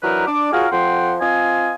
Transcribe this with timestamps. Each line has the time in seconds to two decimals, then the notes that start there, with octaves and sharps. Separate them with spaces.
0.02 E3 F#3 D4 D#4 A#4 B4
0.27 D4 D6
0.52 F4 F#4 G#4 A#4 C#5 F5
0.72 F2 F3 F#5 G5 C6
1.21 C4 F4 D#5 G#5